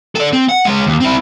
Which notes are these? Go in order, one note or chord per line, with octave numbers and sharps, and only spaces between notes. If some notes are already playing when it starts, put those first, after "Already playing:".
A4 D5
C4
F#5
G#3 C#5
D#2
C4 E4